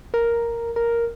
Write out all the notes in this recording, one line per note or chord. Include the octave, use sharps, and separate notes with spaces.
A#4
A#4